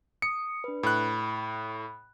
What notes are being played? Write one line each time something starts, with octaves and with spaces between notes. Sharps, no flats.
D#6 C#7
D4 B4
A2 B5 F#6